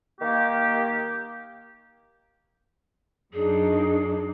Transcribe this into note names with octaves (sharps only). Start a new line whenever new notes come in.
D#3 A#3 G4
F#2 D4 D#4 G#4